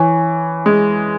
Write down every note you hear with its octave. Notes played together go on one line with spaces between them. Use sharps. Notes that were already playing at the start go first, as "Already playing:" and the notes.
Already playing: E3 C#5 G#5 C#6
G#3